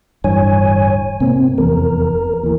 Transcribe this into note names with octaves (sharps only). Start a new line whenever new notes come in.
D1 G2 E3 C#5 G#5
G#2 C3 A#3 C4
F1 E2 A#4
D#2 E3